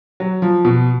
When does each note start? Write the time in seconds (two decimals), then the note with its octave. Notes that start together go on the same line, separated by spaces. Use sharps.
0.20 F#3
0.42 F3
0.65 B2